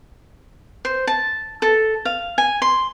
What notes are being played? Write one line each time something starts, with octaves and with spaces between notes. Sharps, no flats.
C5
A5
A4
F5
G#5
C6